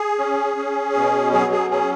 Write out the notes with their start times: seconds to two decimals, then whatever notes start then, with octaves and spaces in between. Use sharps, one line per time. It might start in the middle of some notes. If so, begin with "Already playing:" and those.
Already playing: G#4
0.18 C#4
0.57 C#4
0.95 B2
1.33 F#3 G#4
1.52 G#4
1.71 C#4 G#4